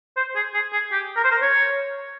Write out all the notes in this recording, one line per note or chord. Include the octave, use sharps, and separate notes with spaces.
C5
G#4
G#4
G#4
G4
A#4
C5
A#4
C#5